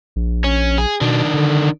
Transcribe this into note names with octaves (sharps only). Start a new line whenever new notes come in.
A#1
C#4
G#4
B2 D#3 D4
D3